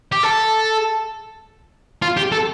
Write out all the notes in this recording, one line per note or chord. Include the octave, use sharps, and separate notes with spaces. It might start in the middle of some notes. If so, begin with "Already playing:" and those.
G4
A4
F4
G4
A4